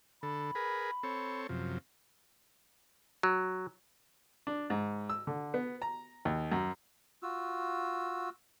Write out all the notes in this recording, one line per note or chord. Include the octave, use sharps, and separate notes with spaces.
D3 A4 B5
G#4 A#4 B4
C4 A4 C#5
F#2 C3 F3
F#3
D4
G#2
E6
D3
B3
A#5
D#2
F#2
F4 F#4 E6